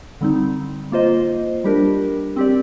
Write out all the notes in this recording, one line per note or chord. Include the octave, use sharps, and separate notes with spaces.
D3 G3 C4 D#4
A#3 F4 C5 D#5
G3 D4 G4 A#4
C4 G4 D5